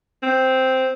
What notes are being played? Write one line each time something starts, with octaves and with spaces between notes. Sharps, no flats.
C4